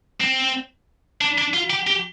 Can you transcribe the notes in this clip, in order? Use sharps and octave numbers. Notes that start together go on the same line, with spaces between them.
C4
D4
D4
F4
G4
G4